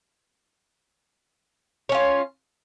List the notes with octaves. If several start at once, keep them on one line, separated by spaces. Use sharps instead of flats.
C#4 F4 C#5